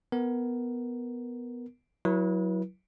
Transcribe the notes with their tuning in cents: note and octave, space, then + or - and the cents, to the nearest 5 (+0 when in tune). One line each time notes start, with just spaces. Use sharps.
B3 +0 A#4 +0
F#3 +0 E4 -5 B4 -40